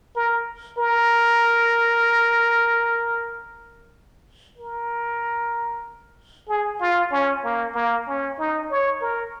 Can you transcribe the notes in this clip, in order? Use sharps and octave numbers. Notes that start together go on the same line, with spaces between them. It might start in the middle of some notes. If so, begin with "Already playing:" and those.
A#4
A#4
A#4
G#4
F4
C#4
A#3
A#3
C#4
D#4
C#5
A#4